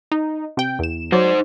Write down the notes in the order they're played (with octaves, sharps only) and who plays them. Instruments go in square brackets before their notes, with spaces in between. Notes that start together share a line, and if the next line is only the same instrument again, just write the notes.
[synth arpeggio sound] D#4
C3 G5
E2 E7
[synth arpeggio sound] F#3 D5 [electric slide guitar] D#4 C5